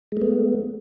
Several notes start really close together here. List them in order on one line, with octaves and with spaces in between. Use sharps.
G#3 A3 B3